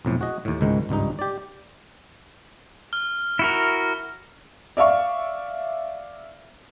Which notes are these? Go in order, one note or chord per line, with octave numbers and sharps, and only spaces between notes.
B1 F2 A2
F#4 G#4 D#5
D#2 A2
C#2 G#2 D#3 G#3
G#1 C#2 G2 D#4
G4 D5
F6
E4 F#4 A#4
D5 E5 F5 C#6